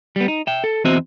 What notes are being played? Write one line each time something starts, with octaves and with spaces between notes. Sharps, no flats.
G3 B3
D#4
E5 G5
A4
E2 C4 F#4 C5 D#5 E5